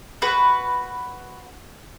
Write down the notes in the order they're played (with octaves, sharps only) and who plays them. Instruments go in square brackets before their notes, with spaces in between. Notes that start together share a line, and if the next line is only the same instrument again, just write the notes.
[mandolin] F#4 B4